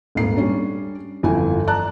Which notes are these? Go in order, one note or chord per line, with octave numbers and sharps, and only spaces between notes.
D#1 G#1 G#2 C7
G3 C#4 D4
G1 F2 E3 G#5
D5 A5 A#5 F#6